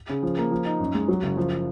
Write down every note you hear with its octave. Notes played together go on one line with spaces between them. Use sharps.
C#3
F3
A#3
F3
D#4
F#2
G#3
F#3
F#1
F3